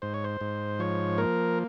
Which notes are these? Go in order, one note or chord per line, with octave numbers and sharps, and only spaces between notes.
G#2 C5
C#5
C5
G#2
F3 C#5
A#3 A#4